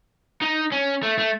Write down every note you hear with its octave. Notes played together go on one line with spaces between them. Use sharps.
D#4
C#4
A3
A3